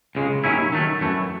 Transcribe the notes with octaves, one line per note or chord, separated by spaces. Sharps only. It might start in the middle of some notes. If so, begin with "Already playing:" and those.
C#2 C#3 G#3
D#2 D#3 F#3 C#4 E4
D#3 F#3 A3
F#2 E3 A3